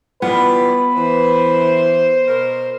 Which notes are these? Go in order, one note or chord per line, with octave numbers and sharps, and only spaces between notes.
E3 G3 B3 F4 B4
E3 C5
B2 A#4